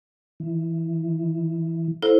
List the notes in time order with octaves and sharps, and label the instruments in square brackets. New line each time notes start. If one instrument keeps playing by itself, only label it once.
[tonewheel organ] E3
[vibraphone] E4 C5 [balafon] A4